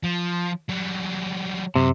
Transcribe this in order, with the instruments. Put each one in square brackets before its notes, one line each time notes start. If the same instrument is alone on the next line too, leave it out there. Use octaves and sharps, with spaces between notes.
[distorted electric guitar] F3
F#3 G3
[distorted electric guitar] F#2 [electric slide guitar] C3